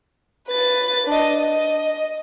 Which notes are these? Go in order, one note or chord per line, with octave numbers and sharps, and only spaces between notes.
B4 A6
D4 D#5
D#5